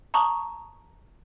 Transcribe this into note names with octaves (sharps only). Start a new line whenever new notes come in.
A5 A#5 C#6 D#6